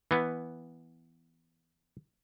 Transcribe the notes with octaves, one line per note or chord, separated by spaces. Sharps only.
E3 B3